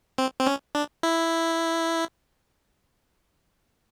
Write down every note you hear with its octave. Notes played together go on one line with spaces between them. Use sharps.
C4
C4
C#4
D4
E4